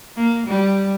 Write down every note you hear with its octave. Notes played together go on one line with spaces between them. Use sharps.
A#3
G3